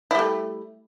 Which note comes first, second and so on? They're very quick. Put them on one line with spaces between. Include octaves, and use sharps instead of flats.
E4 G3 A3